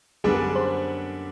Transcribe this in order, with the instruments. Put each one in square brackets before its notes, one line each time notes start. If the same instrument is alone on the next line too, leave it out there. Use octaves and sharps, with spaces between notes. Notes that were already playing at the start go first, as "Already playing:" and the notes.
[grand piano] F#2 D3 G3 B3 D4 [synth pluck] G#4
[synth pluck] G#4
C5